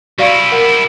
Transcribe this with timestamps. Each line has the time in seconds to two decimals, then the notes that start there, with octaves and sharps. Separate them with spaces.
0.18 G3 E4 F#4 D5 F5
0.52 A#4 F#5